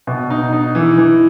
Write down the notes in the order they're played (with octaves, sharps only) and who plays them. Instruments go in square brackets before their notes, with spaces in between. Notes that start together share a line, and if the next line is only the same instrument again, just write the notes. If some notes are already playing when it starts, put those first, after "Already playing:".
[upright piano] B2
D#4
D#4
E3
E3